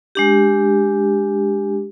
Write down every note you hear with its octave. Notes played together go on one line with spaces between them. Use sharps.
G#3 D4 G4